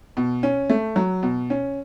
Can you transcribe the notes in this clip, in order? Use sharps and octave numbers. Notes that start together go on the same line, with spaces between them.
B2
C#4
A3
F#3
B2
C#4